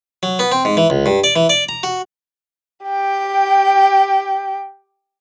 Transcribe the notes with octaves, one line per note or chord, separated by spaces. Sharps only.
F#3
B3
C4
G#2
E3
C#2
G2
D5
E3
D5
A#5
F#4
G4 G5